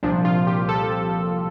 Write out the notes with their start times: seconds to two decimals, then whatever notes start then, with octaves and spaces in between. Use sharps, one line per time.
0.03 C2 A#2 F3 D4
0.25 F4
0.47 G4
0.69 A4